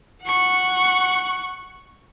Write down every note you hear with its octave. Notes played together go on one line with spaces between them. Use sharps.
F#5 C#6